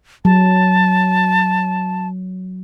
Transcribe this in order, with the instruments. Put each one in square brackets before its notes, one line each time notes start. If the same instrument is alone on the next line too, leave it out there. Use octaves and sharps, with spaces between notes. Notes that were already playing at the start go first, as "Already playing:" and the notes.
[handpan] F#3 [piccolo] A5